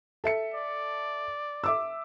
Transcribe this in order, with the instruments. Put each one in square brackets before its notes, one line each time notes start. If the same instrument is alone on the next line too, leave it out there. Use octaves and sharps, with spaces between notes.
[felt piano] A4 E5 C#7
[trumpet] D5
[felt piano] E5 D6 E6